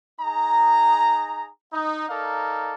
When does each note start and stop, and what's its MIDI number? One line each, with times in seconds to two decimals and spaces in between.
0.21 1.49 63
0.21 1.49 68
0.21 1.49 82
1.73 2.07 63
2.09 2.74 63
2.09 2.74 69
2.09 2.74 70
2.09 2.74 74
2.09 2.74 77